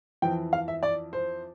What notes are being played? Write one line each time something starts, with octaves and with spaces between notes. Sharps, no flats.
F2 E3 G5
F5
E5
D5
C5